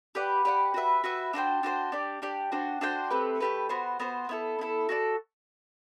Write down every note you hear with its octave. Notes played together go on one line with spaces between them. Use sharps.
G4 B4 D5 F#5
G4 B4 D5 F#5
F#4 B4 E5
F#4 B4 E5
D4 F#4 C5 G5
D4 F#4 C5 G5
D4 G4 D5
D4 G4 D5
D4 F#4 C5 G5
D4 F#4 C5 G5
A3 C4 G4 B4
A3 C4 G4 B4
B3 F#4 C5
B3 F#4 C5
B3 E4 A4
B3 E4 A4
F#4 A4 D5